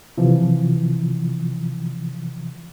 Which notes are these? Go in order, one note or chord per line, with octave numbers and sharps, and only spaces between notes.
C3 E3 F3